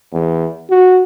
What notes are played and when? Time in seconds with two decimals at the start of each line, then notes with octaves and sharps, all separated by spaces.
0.13 E2
0.70 F#4